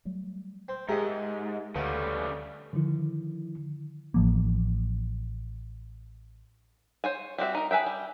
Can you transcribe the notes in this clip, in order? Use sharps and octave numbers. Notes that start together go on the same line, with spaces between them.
F#3 G3 A3
C4
G#2 G#3 G4 G#4 A#4 D#5 E5
D2 C#3 G3 A3 F#4 B4
D3 D#3 F3 E4
A1 F3 A#3
C5 C#5 G#5
G3 C4 F#4 E5
D#4 A#4
G#4 B4 E5 G5
G3